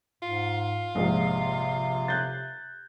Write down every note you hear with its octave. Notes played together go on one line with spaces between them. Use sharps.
G#2 F4
A#1 G#2 C3 G#3
F#6 G6 A6